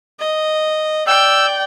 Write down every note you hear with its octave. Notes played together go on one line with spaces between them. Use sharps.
D#5
D5 G5 E6